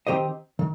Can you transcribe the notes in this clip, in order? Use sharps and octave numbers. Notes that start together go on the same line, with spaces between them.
D#3 C4 G4 C5 D#5
D#3